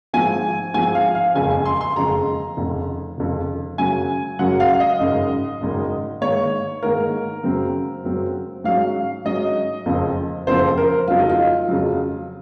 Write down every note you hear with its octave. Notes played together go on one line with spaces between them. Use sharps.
G#2 F3 C4 G#5
G#2 F3 C4 G#5
F5
F5
F#1 F2 C#3 G#3 G#5
G#5
C6
C6
F#1 F2 C#3 G#3 A#5
F1 F2 C#3
F1 F2 C#3
F#2 C#3 F#3 G#5
F#2 C#3 F#3 F#5
F5
F5
D#5
G#1 F#2 C#3
G#1 F#2 C#3
G#2 D#3 A#3 C#5
G#2 D#3 A#3 A#4
F#2 C#3 F#3 C4
F#2 C#3 F#3 C4
G#2 F#3 C#4 F5
G#2 F#3 C#4 D#5
F#1 F2 C#3 F3 C4
F#1 F2 C#3 F3 C4 C5
A#4
F2 C#3 F#3 F4
D#4
F4
F2 C#3 F#3